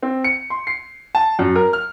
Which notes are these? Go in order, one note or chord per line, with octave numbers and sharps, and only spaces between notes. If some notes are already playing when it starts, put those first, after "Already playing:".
C4
C#7
C6
C7
A5
F#2
A#4
F6